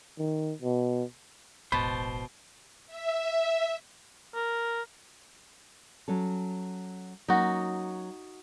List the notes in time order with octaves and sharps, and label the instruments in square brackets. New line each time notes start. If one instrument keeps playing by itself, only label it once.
[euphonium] D#3
B2
[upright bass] E1 A1 [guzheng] B2 [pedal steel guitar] C5 A5 [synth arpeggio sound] B5
[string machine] E5
[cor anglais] A#4
[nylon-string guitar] F#3 C#4 A4
[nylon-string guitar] F#3 A#3 C#4 [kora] D#4 F#4